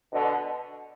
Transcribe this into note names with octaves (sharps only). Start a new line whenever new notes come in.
B2 D3